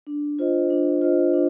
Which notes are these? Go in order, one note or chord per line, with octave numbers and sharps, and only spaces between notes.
D4
F4 C5 D#5
D4
F4 C5 D#5
D4